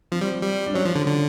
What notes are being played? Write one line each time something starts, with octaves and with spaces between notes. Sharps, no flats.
F3 C4
G3
G3
D4
F#3 C#4
F3
D3
D3